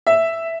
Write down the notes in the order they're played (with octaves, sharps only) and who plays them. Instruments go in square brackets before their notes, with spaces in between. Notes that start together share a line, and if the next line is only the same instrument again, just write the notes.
[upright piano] E5